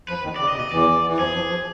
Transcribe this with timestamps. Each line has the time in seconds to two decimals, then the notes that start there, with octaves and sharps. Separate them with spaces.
0.08 F2 F3 B4
0.24 D#2 D#3
0.36 D5
0.39 C#3
0.48 C3 D#5
0.55 B2
0.60 D#5
0.71 E2 E3 D5
1.06 E3
1.18 F2 F3 G#4
1.34 F2 F3
1.50 F3